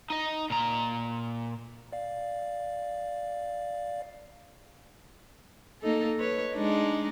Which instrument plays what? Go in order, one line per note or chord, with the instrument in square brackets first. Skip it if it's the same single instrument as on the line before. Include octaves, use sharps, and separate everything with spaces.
[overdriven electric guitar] D#4 D#5
A#2 A#5
[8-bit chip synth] D5 F5
[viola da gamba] A#3 D#4 A4
B4 C#5
G#3 D4 D#4